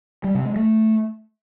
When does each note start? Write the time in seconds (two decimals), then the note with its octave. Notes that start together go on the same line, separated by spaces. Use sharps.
0.24 G3
0.35 C3
0.45 G#3
0.56 A3